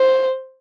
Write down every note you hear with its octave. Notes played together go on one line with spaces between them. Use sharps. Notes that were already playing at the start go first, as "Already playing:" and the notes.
Already playing: C5